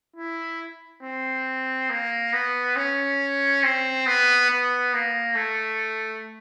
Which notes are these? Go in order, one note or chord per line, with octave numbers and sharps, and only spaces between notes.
E4
C4
A#3
B3
C#4
C4
B3
B3
A#3
A3